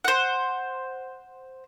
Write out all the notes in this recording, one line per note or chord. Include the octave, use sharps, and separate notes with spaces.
C5 F#5